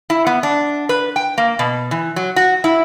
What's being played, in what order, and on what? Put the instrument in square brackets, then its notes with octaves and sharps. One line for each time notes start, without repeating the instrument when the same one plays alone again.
[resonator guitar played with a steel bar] E4
B3
D4
B4
G5
A#3
B2
E3
F#3
F#4
E4